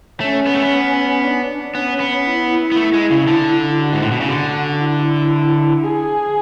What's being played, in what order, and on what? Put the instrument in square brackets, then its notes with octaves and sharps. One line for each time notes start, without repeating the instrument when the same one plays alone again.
[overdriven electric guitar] A3 [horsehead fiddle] C#4
[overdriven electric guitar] B3
A3
B3
[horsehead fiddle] D4
[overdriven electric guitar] B3 [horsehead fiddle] C#4
[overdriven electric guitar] B3
[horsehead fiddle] E4
[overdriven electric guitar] B3
A3
G#3
C#3
D3
[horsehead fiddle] F#4
[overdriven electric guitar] G#2
A2
B2
C#3
[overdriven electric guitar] D3 [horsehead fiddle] F#4
[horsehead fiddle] E4
G#4